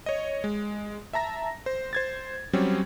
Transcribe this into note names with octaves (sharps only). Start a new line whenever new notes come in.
C#5 D#5
G#3
E5 A5 A#5 A#6
C5
C5 G#6 A6
F#3 G3 C4 C#4